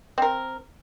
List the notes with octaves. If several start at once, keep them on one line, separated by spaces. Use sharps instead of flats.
C4 A#4